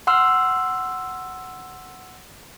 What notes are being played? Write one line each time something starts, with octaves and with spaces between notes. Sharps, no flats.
F#5 C6 E6 F6